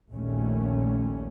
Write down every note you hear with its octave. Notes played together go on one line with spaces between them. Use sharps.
A#1 D#2 A#2 A3 C#4